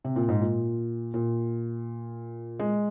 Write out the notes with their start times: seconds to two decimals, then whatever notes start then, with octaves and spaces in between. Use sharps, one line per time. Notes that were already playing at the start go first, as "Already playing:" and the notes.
0.05 C3
0.16 A#2
0.29 G#2
0.41 A#2
1.14 A#2
2.60 G#3